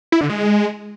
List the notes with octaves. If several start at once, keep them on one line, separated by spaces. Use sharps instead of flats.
E4
D3
G#3